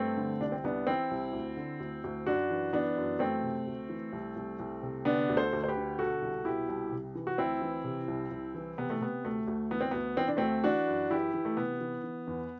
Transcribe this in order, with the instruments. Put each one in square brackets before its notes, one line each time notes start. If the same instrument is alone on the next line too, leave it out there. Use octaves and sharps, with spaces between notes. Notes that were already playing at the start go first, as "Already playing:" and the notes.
Already playing: [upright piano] G2 A3 C4
D3
C2 D4
C4
C2 B3 D4
E3 C4 E4
C2
D2
D3
D2
D2
F#2 D4 F#4
E3
E3 B3 D4
F#2
E3 A3 C4
C3
D2
E3
C2
C2
C2
C3
D3 B3 D4
D2
A4 C5
D2
C5
G4 B4
D3
B2 F#4 A4
C2
B2 E4 G4
C2
C3
E3
F#4
D2 C4 E4
E3
C3
C2
C2
E3
C3 B3
A3
C3 B3
D2 A3
D2
E3 B3
C4
D2 B3
E3 C4
D4
D2 A3 C4
E3 D4 F#4
F#2
E3 E4 G4
E3
A3
C3 B3
E3
E3
E2